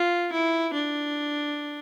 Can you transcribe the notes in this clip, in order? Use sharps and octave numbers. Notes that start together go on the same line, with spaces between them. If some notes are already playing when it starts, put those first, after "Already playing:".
Already playing: F4
E4
D4